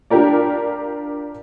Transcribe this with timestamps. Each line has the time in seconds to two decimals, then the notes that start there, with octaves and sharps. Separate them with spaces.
0.10 D4 F4 G4 A#4 D5